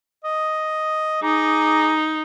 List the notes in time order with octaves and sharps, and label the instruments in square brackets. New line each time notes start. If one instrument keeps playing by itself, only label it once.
[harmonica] D#5
[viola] D#4 [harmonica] G#4 A#5 D6